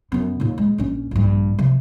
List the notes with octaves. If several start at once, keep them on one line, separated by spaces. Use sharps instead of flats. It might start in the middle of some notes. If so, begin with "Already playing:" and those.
F#2 B3
D#2 A#2
G#3
A#1 C#4
A#1 G2
C3 F3